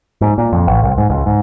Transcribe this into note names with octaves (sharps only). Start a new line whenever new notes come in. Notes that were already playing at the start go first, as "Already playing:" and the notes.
G#2
A#2
F2
A1
C2
G#2
C#2
G#2